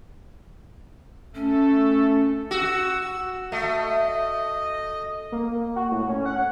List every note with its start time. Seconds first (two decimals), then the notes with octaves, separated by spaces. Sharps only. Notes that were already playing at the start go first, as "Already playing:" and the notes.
1.35 A3 C#4 A4
2.51 F#4 E6
3.52 A3 D#5
5.32 A#3
5.76 F#4
5.91 A2
6.09 C#4
6.26 F#5